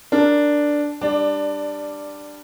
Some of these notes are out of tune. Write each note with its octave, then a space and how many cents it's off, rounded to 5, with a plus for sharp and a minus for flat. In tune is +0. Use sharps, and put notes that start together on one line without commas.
D4 +0 A#4 +0
G3 +15 D4 +15 D5 +0